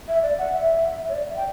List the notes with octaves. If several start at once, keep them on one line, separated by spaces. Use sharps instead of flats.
E5
D5
F#5
E5
C#5
D5
E5
G5